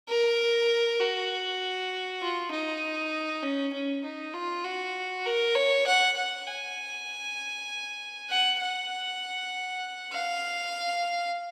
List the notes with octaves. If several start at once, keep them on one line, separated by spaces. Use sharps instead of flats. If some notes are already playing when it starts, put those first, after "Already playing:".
A#4
F#4
F4
D#4
C#4
C#4
D#4
F4
F#4
A#4
C#5
F#5
F#5
G#5
F#5
F#5
F5